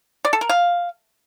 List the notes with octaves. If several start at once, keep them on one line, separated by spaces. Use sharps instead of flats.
D5
A4
A#4
F5